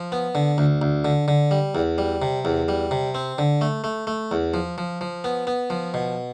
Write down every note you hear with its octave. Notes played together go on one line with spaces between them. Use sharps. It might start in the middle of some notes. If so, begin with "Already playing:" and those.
Already playing: F3
B3
D3
D2
D2
D3
D3
G3
E2
G3
C3
E2
G3
C3
C4
D3
A3
A3
A3
E2
F3
F3
F3
B3
B3
F3
B2